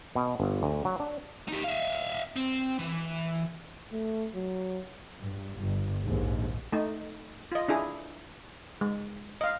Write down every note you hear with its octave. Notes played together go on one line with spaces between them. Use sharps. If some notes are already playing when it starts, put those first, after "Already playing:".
B2
G1
D2
F#3
D4
D#4 G4
E5 F5
C4
E3
A3
F#3
G2
G1
A#1 D#2 G#2
A3 D#4
F4 D#5
D4 E4 G#4
G#3
D#5 F5